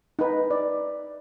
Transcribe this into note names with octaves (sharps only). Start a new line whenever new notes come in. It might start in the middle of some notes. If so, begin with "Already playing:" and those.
D#4 B4
D5